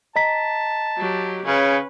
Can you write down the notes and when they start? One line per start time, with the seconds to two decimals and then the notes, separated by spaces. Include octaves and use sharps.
0.16 D#5 A5 A#5 B6
0.97 F#3 G4
1.45 C#3 C#4 B4